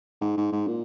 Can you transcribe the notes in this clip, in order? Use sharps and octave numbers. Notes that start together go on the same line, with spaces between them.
G#2
G#2
G#2
A#2